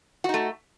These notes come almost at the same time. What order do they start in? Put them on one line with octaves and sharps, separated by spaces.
F#4 D#4 A3